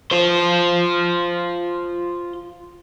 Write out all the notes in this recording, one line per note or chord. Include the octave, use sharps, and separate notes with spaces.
F4 C5